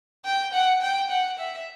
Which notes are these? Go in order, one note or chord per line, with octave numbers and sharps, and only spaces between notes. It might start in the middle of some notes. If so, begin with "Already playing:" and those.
G5
F#5
G5
F#5
E5